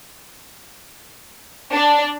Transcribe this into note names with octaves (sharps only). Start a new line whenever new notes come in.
D4